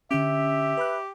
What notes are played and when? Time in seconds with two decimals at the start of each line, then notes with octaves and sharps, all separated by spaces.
0.11 D3 C#4 G4 E5
0.77 B4 B5 F#6